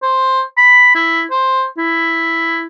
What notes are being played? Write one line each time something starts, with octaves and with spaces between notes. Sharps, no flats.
C5
B5
E4
C5
E4